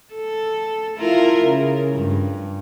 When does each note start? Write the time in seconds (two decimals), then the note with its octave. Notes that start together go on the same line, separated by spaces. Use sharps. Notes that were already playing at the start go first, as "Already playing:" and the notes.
0.14 A4
0.98 E4 F4 A#4
1.45 C#3
1.95 G2